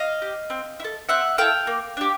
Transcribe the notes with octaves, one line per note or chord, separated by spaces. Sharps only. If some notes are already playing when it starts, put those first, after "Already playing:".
Already playing: D#5 F5
G4
C4
E4
A4
C4 E5 F#5
E4 A4 F5 G5
A#3
D4 G4